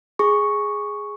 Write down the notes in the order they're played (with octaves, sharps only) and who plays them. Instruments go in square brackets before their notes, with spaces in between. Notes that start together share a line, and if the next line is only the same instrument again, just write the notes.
[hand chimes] G#4 C#6